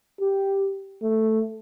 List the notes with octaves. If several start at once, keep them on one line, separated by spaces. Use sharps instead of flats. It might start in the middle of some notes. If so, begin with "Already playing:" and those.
G4
A3